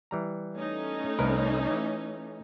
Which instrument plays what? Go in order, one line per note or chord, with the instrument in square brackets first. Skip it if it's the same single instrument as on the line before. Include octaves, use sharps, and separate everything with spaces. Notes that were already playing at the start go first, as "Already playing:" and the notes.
[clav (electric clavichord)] E3 G3 A#5
[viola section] A3 C#4 D#4
[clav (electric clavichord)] C2 A#4 B4
E3